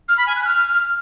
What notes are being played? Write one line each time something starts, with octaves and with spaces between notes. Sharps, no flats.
F6
B5
G#5
F#6
F6